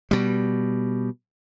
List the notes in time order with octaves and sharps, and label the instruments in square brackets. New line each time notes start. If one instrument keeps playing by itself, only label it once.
[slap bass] B2 G3